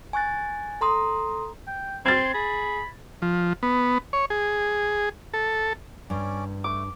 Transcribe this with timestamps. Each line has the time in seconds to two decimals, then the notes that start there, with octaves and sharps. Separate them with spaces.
0.13 G#5 C#6 F#6 A6
0.81 A4 A#5 C6 D#6
1.67 G5
2.06 C4 C6 G#6 A6
2.34 G#4 B5
3.22 F3
3.63 B3
4.13 C#5
4.30 G#4
5.34 A4
6.10 G2 C#4 D5
6.64 A3 D6